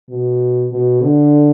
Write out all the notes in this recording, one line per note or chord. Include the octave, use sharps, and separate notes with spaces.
B2
B2
D3